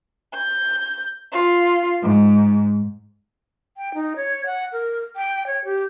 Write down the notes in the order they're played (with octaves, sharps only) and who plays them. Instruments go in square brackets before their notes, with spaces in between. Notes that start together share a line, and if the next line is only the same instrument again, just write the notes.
[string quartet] G6
F4
G#2
[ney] G5
D#4
C#5
F#5
A#4
G5
C#5
G4